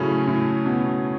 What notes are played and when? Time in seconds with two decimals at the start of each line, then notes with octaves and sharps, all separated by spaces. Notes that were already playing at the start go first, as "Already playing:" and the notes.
Already playing: A2 C#3 F#3 A3 C#4
0.27 A2
0.66 B2